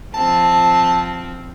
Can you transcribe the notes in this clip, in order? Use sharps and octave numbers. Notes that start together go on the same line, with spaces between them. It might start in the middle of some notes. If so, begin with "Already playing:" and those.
F3 C4 A5